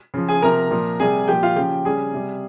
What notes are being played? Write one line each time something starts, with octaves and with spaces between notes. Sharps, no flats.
C#3 F3
G#4 G#5
C3 F3 A#4 A#5
A#2 F3
C3 G3 G#4 G#5
A#2 F3 G4 G5
F4 F5
C#3 F3 G4 G5
C#3 G3 G#4 G#5
C3 G3